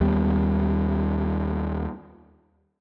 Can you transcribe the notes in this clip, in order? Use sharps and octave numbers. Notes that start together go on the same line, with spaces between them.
D#2 G3 B3